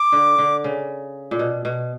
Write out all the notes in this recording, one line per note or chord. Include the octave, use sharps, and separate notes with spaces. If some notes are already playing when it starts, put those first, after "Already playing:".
Already playing: D6
D3
D3
C#3
A#2
B2
B2